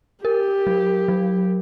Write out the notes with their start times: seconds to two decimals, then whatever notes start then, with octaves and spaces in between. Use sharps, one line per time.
0.25 G4 A#4
0.67 F#3
1.08 F#3